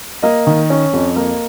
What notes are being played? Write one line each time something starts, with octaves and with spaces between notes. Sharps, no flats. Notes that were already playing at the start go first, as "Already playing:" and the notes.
A#3 D#5
D#3
C#4
F2
A#3